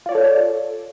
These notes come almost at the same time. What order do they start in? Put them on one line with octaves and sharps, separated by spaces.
F4 D5 C#5 A4